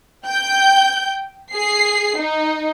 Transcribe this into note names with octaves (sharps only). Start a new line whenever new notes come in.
G5 G6
G#4 C7
D#4